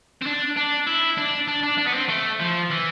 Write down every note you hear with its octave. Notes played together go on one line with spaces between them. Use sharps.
C4
D4
D4
E4
D4
D4
D4
D4
B3
C4
A3
F3
E3